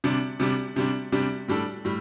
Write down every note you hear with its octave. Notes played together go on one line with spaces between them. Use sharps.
C3 G3 D4
C3 G3 D4
C3 G3 D4
C3 G3 D4
A2 G3 D4 A4
A2 G3